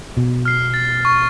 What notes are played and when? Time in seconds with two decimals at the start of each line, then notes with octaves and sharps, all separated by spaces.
0.17 B2
0.45 F6 C7
0.74 A6
1.05 C#6